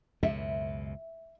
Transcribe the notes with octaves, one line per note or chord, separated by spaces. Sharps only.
C#2 F#2 B2 E5